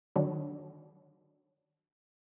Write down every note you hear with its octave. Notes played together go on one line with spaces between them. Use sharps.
D3 D#3 F#3